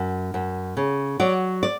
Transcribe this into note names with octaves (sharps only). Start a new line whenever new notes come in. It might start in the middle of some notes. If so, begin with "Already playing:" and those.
Already playing: F#2
F#2
C#3
F#3 D5
D5